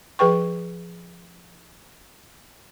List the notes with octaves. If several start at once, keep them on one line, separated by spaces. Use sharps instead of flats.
F3 G#4 B4 G5 C#6